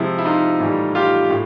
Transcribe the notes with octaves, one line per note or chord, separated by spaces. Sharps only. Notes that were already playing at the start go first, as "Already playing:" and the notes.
Already playing: C3 F3 G#3 E4
E4
D#4 F4
A2 E3 G3
F4 G4
A2